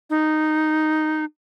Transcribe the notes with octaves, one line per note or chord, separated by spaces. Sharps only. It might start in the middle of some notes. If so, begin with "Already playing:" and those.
D#4